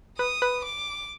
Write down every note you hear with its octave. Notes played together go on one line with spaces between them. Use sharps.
B4 D#6
B4
D6